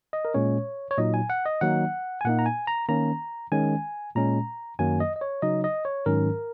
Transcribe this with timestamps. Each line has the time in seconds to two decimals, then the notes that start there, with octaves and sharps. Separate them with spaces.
0.13 D#5
0.25 A#4
0.34 A#2 G#3 C#4 C#5
0.91 C#5
0.98 A#2 F#3 D#4 D#5
1.14 G#5
1.30 F#5
1.46 D#5
1.61 D#3 F#3 A#3 D#4 F#5
2.21 G#5
2.25 A#2 A#3 D#4 F#5
2.39 A#5
2.46 G#5
2.67 A#5
2.89 D#3 A#3 C#4 A#5
3.52 D#3 G#3 C#4 G#5
4.16 A#2 G#3 C#4 A#5
4.79 F#2 D#3 F#3 A#3 G#5
5.00 D#5
5.16 D#5
5.21 C#5
5.42 C#3 F#3 D#4 D#5
5.64 D#5
5.85 C#5
6.06 G#2 D#3 F#3 C#4 A#4